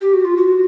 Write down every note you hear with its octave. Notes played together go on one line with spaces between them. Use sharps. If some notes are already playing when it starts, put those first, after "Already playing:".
G4
F#4
F4
F#4